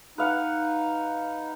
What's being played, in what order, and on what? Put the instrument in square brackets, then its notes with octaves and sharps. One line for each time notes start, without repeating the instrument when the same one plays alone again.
[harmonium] D#4 [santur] B4 F5 F#5